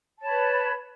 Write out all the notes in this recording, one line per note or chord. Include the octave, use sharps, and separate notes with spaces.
B4 C#5 A5 B5